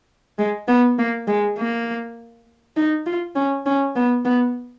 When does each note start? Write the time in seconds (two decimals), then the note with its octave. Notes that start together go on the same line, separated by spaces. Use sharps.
0.39 G#3
0.68 B3
0.98 A#3
1.28 G#3
1.58 A#3
2.77 D#4
3.06 F4
3.36 C#4
3.66 C#4
3.96 B3
4.25 B3